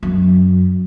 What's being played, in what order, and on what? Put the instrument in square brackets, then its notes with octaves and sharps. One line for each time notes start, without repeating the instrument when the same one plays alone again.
[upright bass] F#2